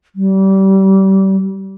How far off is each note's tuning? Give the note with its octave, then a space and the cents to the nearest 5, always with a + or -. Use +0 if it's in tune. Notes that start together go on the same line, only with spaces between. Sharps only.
G3 -30